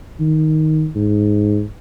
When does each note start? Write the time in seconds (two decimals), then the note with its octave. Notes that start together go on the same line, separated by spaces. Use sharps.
0.20 D#3
0.95 G#2